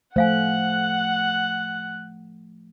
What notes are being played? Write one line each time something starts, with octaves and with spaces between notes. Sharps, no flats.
F3 A3 C5 F5 F#5 G#5 F#6